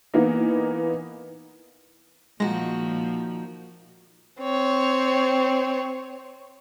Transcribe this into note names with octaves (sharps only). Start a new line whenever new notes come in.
E3 A#3 B3 D#4
A#2 D#3 F3 G#3 F#4 A#6
C4 C#5